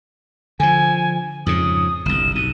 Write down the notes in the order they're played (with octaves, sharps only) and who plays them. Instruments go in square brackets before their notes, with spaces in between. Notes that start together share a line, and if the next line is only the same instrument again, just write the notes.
[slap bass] D3 F3 [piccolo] G#5
[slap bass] F2 G#2 C#3 [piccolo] D#6
[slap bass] G1 C2 [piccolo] E7
[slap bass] B1 [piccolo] D#7